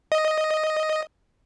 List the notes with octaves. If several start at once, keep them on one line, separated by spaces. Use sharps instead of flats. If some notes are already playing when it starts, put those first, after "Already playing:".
D#5